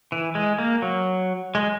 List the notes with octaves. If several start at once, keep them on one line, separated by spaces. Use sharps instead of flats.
E3
G#3
A#3
F#3
G#3